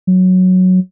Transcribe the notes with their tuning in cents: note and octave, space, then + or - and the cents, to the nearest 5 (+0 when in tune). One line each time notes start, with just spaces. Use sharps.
F#3 -5